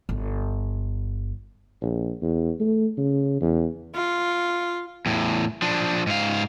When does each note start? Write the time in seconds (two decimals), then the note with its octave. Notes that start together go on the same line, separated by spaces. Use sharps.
0.09 G1
1.81 A#1
2.22 E2
2.60 A3
2.97 C#3
3.41 E2
3.95 F4
5.06 E2 A2
5.62 F3 D4
6.07 G#2 F5